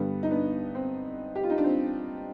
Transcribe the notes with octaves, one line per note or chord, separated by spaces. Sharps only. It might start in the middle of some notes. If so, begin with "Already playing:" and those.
Already playing: G2 D3 G3 B3 D4
D#4
B3 D4
C4
G4
F4
D#4
D4
C4